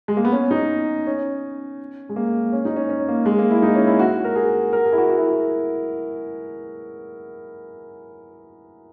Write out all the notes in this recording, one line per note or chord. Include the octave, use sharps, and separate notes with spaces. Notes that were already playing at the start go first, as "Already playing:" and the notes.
G#3
A#3
B3
C#4
D#4
C#4
G#3
A#3
C#4
D#4
C#4
C#4
A#3
G#3
A#3
E4
D#4
C#4
E4
F#4
A#4
G#4
A#4
G#4
E4
F#4
F#4
E4
F#4